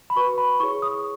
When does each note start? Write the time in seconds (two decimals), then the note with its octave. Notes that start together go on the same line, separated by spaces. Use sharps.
0.10 B5
0.16 F#4 B4 C#6
0.38 B5
0.60 E4 G#4 C#5 C#6
0.82 D#6